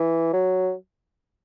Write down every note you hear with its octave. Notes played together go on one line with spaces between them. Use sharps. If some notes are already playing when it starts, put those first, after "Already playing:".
Already playing: E3
F#3